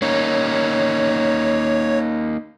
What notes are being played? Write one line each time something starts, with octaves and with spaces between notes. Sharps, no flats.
A#3 C#4 D#4 C#5